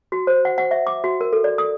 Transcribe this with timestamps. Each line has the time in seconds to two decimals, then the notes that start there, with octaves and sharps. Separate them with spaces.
0.12 F#4
0.27 C5
0.45 F#5
0.58 F#5
0.71 E5
0.87 D6
1.04 F#4
1.21 A#4
1.33 A4
1.44 D5
1.58 D#6